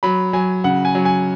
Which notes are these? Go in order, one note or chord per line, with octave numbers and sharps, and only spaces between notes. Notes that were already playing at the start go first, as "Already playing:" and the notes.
F#3 B5
F#3 G#5
C#3 F#5
G#5
F#3
G#5